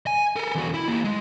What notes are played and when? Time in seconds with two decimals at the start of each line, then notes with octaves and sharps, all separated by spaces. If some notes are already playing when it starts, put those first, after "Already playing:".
0.07 G#5
0.36 A4 A#4
0.55 E2 F#4
0.74 E4
0.88 A#3 G4
1.04 G#3